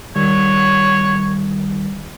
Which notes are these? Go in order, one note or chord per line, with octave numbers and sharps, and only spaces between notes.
D#3 G3 C#5